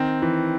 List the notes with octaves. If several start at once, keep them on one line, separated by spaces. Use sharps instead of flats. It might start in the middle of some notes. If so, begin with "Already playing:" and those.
Already playing: D#3 C4
E3